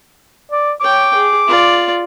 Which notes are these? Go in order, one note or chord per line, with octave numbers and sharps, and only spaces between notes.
D5
C#5 G5 D6
G#4
F4 D5